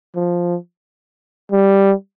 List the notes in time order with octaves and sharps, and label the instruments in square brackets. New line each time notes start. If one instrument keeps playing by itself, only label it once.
[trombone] F3
G3